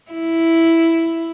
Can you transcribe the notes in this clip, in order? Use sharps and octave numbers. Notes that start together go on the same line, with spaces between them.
E4